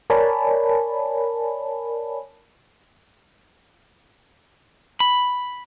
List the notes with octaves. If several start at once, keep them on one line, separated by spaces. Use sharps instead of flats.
A#4 C#5 D5 G#5 A5 B5
B5